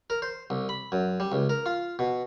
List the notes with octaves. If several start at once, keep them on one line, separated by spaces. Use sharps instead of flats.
A#4
C5
C2
B5
F#2
G3
C#2
A#4
F4
B2